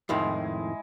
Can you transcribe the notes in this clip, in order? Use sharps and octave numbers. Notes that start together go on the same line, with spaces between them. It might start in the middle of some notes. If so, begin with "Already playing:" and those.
F2 A2 D#3 G#3 E4